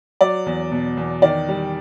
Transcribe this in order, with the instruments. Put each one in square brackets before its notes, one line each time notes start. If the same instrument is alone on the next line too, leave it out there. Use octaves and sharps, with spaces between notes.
[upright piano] F#3 D5
E2
B2
E2
D#3 D5
G3